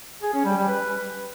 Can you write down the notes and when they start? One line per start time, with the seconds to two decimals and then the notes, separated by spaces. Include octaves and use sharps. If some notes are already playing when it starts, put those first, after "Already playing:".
0.23 G#4
0.34 C#4
0.45 G3
0.56 G3
0.68 B4